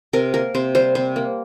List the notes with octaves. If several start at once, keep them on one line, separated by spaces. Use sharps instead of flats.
C3 A#4
A#3 A#4
C3 C5
G3 C5
C3 C5
A#3